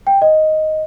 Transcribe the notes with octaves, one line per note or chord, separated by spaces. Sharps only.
G5
D#5